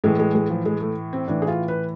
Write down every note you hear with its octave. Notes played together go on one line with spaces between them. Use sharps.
A2 E3 G#3
G#3
G#3
F3
G#3
A3
C4
A2 E3 D4
G#4
F4
B4